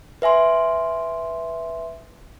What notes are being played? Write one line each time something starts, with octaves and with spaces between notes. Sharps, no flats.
B4 E5 G#5 C6